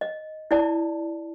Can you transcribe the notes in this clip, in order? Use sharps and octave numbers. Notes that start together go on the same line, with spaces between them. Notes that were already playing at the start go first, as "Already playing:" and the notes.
D#5
E4 D5 A5